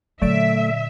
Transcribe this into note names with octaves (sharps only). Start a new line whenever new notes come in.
A#2 D3 F#3 A3 D5 E5 D7